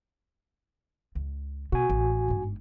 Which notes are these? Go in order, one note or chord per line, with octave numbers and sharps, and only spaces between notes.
C#2
B2 F#4 G#5
A1
G1 G#2